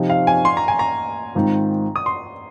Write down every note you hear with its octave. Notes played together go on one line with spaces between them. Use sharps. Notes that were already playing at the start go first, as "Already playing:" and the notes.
Already playing: C3 F3 C4 D#4
F5
G#5
C6
A#5
G#5
A#5
G#2 D#3 C4 F4
D#6
C6